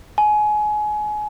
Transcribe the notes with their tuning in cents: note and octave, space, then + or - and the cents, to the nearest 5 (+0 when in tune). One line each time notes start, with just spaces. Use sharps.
G#5 +25